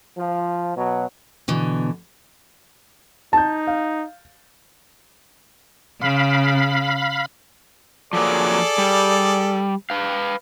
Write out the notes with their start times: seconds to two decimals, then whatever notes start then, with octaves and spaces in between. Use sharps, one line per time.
0.17 F3
0.76 B2 F#3
1.48 B2 D3 E3
3.33 D#4 A5 G6
3.67 F5
6.01 C#3 F5 B5
8.13 F3 F#3 A#3 G#4 A4 D5
8.78 G3
9.90 B4 F5